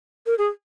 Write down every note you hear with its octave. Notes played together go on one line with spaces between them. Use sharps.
A#4
G#4